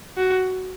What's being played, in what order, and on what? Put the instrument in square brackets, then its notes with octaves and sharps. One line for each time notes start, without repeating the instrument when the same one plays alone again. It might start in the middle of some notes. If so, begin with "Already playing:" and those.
[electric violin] F#4